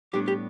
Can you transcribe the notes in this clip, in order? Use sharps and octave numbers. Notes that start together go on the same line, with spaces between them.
A2 G3 B3 D4 G4
G4